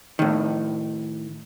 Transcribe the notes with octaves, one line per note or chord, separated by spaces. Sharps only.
A2 D#3